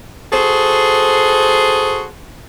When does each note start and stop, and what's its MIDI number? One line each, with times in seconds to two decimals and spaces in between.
0.32 2.07 66
0.32 2.07 68
0.32 2.07 69
0.32 2.07 72